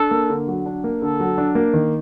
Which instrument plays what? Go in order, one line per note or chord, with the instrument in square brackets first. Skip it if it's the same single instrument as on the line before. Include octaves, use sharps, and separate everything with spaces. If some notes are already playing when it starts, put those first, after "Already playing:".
Already playing: [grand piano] D4 [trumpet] A4
[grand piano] A#3
D3
F#3
D4
A#3
[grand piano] D3 [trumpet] A4
[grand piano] F#3
D4
A#3
D#3